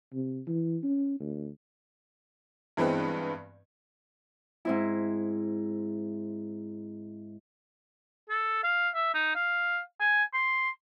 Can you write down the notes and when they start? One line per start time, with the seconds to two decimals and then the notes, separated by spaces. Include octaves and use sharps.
0.14 C3
0.47 E3
0.84 C#4
1.20 D2
2.77 G2 E3 G#3 B3 C4
4.65 G#2 C4 E4
8.30 A4
8.63 F5
8.95 E5
9.14 D#4
9.35 F5
10.00 G#5
10.33 C6